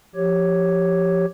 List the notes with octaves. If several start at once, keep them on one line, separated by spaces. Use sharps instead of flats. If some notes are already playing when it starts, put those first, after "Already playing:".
F3 G4 C#5